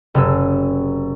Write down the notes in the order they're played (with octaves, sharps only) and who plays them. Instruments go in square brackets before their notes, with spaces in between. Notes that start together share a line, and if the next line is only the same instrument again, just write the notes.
[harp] F#1 C3 F#3 G#4 E6